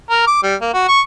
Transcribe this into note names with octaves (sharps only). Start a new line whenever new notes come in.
A#4
D6
G3
A#3
F#4
C#6